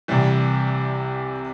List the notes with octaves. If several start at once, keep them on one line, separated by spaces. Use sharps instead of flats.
C2 C3 E3 G3